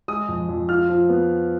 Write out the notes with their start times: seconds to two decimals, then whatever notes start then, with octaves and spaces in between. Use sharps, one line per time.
0.08 G#3 D#6
0.28 F2
0.49 F2
0.69 F4 F6
0.89 F3
1.09 B3